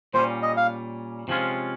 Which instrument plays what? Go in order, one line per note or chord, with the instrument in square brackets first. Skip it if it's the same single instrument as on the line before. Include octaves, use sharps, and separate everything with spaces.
[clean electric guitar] A#2 G3 C#4 [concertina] C5
[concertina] D#5
F5
[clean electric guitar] C3 F3 G#3 C#4 F4